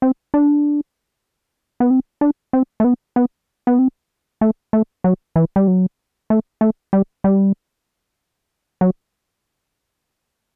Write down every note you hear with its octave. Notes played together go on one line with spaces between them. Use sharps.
C4
D4
B3
C4
D4
C4
A3
B3
B3
B3
C4
A3
A3
F#3
E3
G3
F#3
A3
A3
G3
G3
F#3